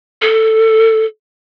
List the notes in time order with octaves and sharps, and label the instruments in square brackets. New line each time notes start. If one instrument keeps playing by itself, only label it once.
[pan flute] A4